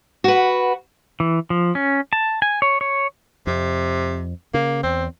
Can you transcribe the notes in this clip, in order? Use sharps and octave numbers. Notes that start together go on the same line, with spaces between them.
F#4 B4
E3
F3
C#4
A5
G#5
C#5
C#5
F2 C3
C#3 A#3
E2 C4